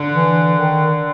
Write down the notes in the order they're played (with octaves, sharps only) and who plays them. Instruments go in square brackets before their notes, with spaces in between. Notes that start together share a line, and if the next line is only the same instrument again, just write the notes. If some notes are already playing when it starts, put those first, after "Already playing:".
Already playing: [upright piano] D3
[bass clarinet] E3
D#3